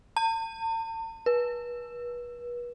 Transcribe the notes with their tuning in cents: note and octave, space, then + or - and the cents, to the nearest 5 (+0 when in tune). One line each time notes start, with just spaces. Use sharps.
A5 +45
B4 -35